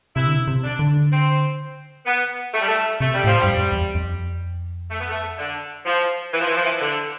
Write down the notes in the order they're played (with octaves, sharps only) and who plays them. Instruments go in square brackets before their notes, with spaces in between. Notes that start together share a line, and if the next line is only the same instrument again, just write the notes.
[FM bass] C3 [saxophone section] E4
[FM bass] D3
C3
C3
[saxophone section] D4
[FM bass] D3
[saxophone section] C4
B3
A3
G3
A3
[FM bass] C3 [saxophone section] A3
[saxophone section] G3
[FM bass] A2 [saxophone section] F3
[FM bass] G2 [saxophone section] G3
[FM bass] F2
E2
F2
[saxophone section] A3
B3
A3
D3
F3
E3
F3
E3
F3
E3
D3